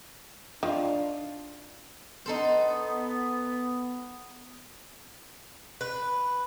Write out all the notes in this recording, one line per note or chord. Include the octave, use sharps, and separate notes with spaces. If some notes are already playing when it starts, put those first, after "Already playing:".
D#3 D4 F4
B3 D#4 A4 C5
B4